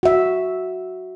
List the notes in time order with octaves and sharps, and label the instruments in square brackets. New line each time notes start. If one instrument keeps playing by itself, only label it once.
[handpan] F#4 E5